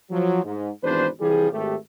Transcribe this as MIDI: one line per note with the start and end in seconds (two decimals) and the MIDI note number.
0.11 0.42 53
0.11 0.42 54
0.45 0.69 44
0.84 1.08 32
0.84 1.08 40
0.84 1.08 48
0.84 1.08 62
0.84 1.08 71
0.84 1.08 72
1.21 1.52 36
1.21 1.52 52
1.21 1.52 53
1.21 1.52 55
1.21 1.52 67
1.21 1.52 68
1.52 1.75 32
1.52 1.75 57
1.52 1.75 67